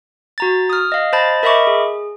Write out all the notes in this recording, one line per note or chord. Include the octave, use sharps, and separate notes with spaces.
F#4 A#5 A6
D#6 F6
D#5 F5
C5 D#5 A5 B5 A6
A#4 D#5 E5 B5 C#6 D6
G#4